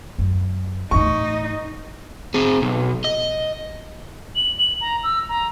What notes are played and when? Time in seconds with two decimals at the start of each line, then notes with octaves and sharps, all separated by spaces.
0.19 F#2
0.91 E2 A2 D#4 C#6
2.34 C4 G#4
2.62 B1
3.04 D#5
4.36 F#7
4.58 F#7
4.81 A#5
5.03 E6
5.29 A#5